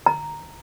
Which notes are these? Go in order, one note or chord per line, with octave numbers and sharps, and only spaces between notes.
A#5